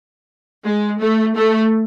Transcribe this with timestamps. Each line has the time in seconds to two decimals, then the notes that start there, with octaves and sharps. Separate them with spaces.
0.63 G#3
0.99 A3
1.35 A3